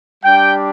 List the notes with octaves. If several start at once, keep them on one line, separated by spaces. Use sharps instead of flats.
G3 D4 G4 G5